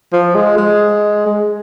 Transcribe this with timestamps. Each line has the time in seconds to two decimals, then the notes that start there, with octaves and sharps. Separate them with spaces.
0.12 F3
0.34 G#3
0.58 G#3
1.26 G#3